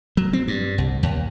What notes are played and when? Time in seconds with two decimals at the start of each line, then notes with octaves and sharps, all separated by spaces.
0.17 F#3
0.33 C4
0.48 G2
0.78 C2
1.03 D#2